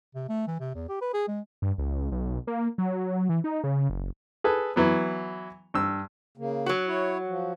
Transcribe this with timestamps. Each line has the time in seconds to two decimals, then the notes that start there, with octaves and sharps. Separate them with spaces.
0.15 C3
0.29 A3
0.47 E3
0.60 C3
0.75 E2
0.89 G4
1.01 B4
1.14 G#4
1.28 G#3
1.62 G2
1.78 C#2
2.12 B1
2.47 A#3
2.78 F#3
3.29 E3
3.44 D#4
3.64 C#3
3.90 F#1
4.44 G#4 A4 B4
4.76 E3 F#3 B3
5.74 G2 E6
6.38 C#3 A#3
6.66 F#3 F#4
6.87 E4 C#5
7.27 F3